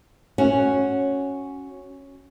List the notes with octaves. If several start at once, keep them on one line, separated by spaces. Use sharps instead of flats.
C#4 F#4